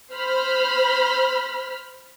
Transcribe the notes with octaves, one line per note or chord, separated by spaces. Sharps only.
C5 B5 F6